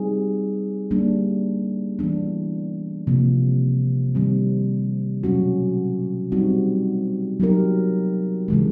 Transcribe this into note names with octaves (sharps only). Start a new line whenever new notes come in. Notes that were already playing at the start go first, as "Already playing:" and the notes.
Already playing: G3 C4 D#4 G#4
G3 A#3 D4
E3 G3 B3 D4
C3 F3 A#3
D#3 G3 C4
B2 F#3 A3 C#4 F#4
G3 C4 D#4 F#4
F#3 B3 D#4 G4 A#4
C#3 E3 G#3